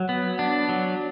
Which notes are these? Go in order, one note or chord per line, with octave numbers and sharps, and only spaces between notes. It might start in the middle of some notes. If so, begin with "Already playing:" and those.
Already playing: F#3
B3
D4
F#3